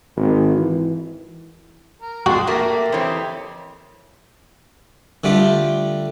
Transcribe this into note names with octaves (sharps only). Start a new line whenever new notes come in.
G#1
E3
A#4
G#3 D4 F#4 C6
A3 A#3 G4 A#4
F2 E3 G4 C5 C#5
D3 G3 A3 F4 G4